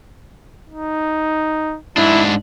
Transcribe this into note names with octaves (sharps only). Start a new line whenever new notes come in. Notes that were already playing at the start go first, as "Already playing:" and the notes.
D#4
G#2 D4 E4